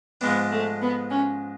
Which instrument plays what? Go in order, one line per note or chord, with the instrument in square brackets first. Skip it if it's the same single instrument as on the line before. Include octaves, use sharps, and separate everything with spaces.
[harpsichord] G#2 F3 G#3 D4 [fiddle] B3
[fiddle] A3
B3
C#4